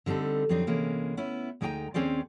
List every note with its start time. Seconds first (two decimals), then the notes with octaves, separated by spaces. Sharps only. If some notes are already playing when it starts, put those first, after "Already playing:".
0.06 D3 G3 C4 D#4 A4
0.49 F2 F#3 C4 D4 D#4
0.67 C3 E3 G#3 A#3 C#4
1.17 B3 C#4 E4
1.61 D2 G#3 D#4 D5 G5 A#5
1.94 D#2 C4 C#4 G#4 C5 D5